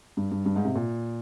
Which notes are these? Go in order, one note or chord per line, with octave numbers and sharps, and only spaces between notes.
G2
G2
G2
G#2
C3
A#2